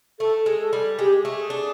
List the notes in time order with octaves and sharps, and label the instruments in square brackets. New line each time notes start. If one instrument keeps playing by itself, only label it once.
[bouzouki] A3 [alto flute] A4
[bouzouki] G#3
[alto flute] A4
[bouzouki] G3
[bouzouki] G#3 [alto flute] G4
[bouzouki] A3
[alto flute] G#4
[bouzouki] D4